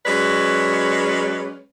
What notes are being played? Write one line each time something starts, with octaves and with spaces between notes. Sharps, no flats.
F#3 G#3 C#4 B4 C#5 D5